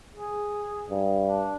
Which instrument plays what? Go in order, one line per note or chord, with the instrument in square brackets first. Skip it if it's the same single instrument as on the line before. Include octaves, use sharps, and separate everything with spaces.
[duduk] G#4
[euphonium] G2
[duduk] D4